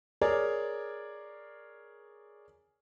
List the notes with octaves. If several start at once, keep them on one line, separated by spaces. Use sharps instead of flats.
G#4 A#4 C#5 D5